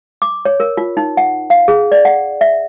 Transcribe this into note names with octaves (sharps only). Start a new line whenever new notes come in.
D6
C#5
A#4
F4
D#4
F#5
F5
G#4
D5
F#5
E5